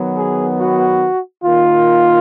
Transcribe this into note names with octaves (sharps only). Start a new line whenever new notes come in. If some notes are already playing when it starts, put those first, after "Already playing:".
Already playing: D#3 F#3 B3
G#4
F#4
D#3 A#3 F4